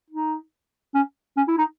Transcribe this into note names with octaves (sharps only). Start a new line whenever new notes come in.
D#4
C#4
C#4
E4
D#4